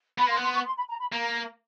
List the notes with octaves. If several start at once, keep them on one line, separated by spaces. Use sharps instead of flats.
B3 B5
A#3 C6
B3
C6
C#6
C6
B5
A#5
B5
A#3 A#5